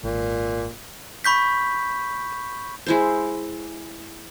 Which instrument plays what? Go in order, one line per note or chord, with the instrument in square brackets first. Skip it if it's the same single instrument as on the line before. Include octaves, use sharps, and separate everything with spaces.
[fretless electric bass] G#1 [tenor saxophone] A#2
[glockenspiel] B5 C#6 G6 B6
[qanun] G#3 E4 C5